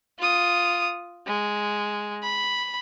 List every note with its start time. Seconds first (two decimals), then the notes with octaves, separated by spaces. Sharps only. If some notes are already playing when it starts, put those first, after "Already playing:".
0.19 F4 D#6
1.26 G#3
2.23 B5